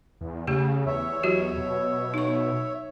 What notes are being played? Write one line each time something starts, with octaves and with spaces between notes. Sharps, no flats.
E2
C#3 A3 G4
E2 C#5 E5
F#3 F#4 G4
B2
D#4 C#6